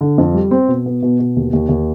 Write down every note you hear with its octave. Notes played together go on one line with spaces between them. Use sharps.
D3
F2
G3
C4
B2
B3
B2
B2
D#2
D#2
D#2